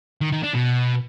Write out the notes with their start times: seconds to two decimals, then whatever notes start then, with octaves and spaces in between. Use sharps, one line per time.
0.21 D#3
0.32 D#3
0.43 D4
0.55 B2